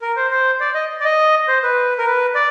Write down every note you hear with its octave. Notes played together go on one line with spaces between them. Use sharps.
A#4
C5
C5
D5
D#5
D5
D#5
C5
B4
A#4
B4
D5